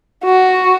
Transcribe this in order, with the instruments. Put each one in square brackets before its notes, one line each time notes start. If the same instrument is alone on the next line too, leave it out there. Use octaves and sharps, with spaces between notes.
[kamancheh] F#4